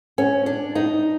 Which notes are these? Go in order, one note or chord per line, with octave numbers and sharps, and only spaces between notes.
C#4
D4
D#4